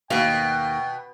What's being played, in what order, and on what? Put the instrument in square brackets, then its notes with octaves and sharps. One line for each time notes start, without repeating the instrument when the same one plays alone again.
[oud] D#2 F5 [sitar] B2 [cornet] G5